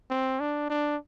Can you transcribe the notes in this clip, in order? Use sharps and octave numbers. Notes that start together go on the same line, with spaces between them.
C4
D4
D4